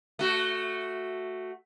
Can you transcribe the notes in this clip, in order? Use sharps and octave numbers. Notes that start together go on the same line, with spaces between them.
A3 F#4